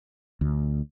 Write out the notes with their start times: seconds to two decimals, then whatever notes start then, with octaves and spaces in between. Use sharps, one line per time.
0.41 D2